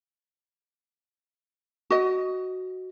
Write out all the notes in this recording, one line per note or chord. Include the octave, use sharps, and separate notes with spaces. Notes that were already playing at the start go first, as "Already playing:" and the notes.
F#4 D#5